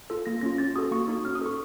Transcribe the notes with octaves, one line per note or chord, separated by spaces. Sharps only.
F4 A4
A#3 A#6
C#4 F4 A#6
C#4 A6
F#4 A4 D#6
A#3 C#6
D#4 F#4
C#4 F6
D#6
A4 C#6